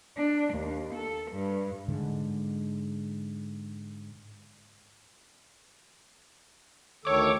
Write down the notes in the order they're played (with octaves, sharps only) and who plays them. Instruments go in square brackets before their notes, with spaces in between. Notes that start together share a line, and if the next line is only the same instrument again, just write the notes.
[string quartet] D4
D#2
A4
G2
[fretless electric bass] G#2 D3 G#3
[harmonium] D2 D#3 A4 [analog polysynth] C#5 D6